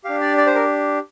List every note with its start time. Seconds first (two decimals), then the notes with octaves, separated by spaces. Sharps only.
0.04 D4 G4 F5
0.21 D5
0.38 D5
0.46 C5
0.55 A#4